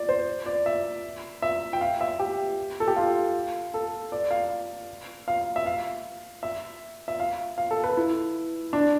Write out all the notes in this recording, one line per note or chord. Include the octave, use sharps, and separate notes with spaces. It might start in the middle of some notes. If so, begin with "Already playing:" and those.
Already playing: D5
C5
D5
E5
E5
G5
F5
E5
G4
A4
G4
F4
A4
D5
F5
F5
E5
F5
E5
E5
F5
F5
A4
B4
E4
D4